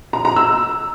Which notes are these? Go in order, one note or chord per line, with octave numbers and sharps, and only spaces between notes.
A#5
A#5
E6